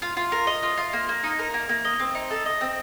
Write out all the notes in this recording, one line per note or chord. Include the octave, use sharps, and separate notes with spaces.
F4
F4
A#4
D#5
F4
F4
A#3
A#3
D#4
A#4
A#3
A#3
D#5
C4
D#4
A4
D#5
C4